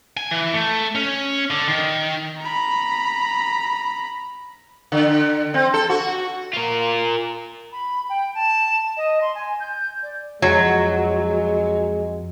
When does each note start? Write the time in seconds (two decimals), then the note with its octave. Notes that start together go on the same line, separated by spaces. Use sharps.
0.17 G#5
0.31 E3
0.54 A3
0.95 C#4
1.50 D3
1.68 D#3
2.38 A#5 B5
4.92 D3
5.54 C4
5.74 A4
5.90 F#4
6.53 F4 A#4
7.72 B5
8.09 G5
8.35 A5
8.97 D#5
9.21 C6
9.35 G#5
9.61 G6
10.03 D5
10.42 F2 F#3 G#3 F#5